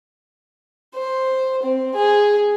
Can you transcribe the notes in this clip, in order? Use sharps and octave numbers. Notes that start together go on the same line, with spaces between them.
C5
C4
G#4